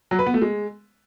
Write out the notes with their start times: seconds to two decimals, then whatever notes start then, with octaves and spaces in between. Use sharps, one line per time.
0.11 F#3
0.19 B4
0.26 B3
0.34 A3
0.42 G#3